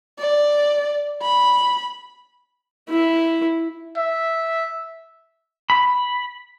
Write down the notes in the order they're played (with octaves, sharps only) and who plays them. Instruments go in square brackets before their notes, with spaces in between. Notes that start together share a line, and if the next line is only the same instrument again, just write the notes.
[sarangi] D5
B5
[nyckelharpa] E4
[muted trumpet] E5
[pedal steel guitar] B5